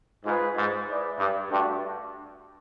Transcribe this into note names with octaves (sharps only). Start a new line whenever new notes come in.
G#2 F4 G#4 B4
G#2
E4 G#4 B4 D5
G2
G2 A3 D4 F#4